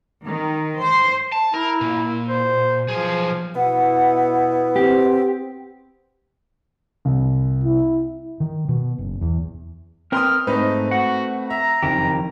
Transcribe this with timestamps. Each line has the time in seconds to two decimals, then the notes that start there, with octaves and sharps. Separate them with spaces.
0.24 D#3
0.81 C5
1.32 A5
1.54 E4 A#4
1.81 A#2
2.29 C5
2.88 B1 F3 G#4
3.56 B2 B3 E4 F#5
4.76 C4 G4
7.05 C2
7.64 E4
8.40 D#3
8.68 B2
8.98 F#1
9.21 E2
10.12 C4 A#4 B4 G5 C6 D#6 F6
10.47 G#2 A3 C4 D#4 B4 D#5
10.91 F#4 F#5
11.50 E5 A#5
11.82 F#1 F2 D#3 G4